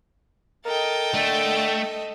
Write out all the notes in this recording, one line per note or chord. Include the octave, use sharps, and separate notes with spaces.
A4 A#4 D#5 G5 A6
D3 A3